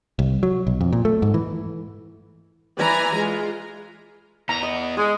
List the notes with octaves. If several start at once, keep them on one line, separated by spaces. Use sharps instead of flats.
C2
F#3
B1
F2
A#2
A3
G#2
E3
E3 D5 G#5 A#5
G#3 F4
E2 B3 A#5
D#5
G#3 G#4